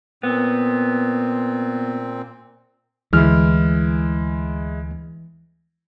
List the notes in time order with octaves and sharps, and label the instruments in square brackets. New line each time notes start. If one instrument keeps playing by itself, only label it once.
[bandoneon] A#2 C4 [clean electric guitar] B3
[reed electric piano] D2 F6 [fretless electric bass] E3 [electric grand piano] G#3 E4